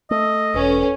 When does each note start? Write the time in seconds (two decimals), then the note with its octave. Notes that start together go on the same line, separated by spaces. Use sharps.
0.11 A3 D#5 E6
0.54 E1 C#4 A4 B4